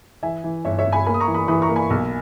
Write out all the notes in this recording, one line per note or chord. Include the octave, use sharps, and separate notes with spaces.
E3 E5 G#5
E3
G1 C#5 E5
C#5 E5
G1
G#5 B5
A#3 G#5 B5
D#6
A#5 C#6
E3
B5 D#6
E3 B5 D#6
A#5 C#6
A#3
G#5 B5
B1